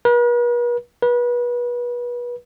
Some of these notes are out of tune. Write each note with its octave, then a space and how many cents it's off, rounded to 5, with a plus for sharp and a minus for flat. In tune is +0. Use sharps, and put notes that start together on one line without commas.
B4 -45
B4 -30